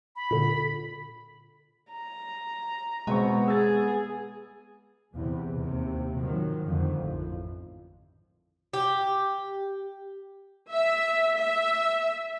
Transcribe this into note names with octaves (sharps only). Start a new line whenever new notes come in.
B5
A#2 D3
A#5
B2 G#3 B3 C4 C#6
B3 G#4 E6 A6
E2 C3
D#2 C3
G#2 D#3 F3 F#3
F2 G#2 D3 D#3
A1 F3
G4
E5
E5